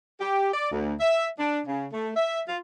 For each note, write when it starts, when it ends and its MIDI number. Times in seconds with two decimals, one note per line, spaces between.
0.20 0.48 67
0.54 0.71 74
0.72 0.94 38
1.00 1.27 76
1.38 1.60 62
1.67 1.86 49
1.93 2.10 57
2.16 2.41 76
2.48 2.57 65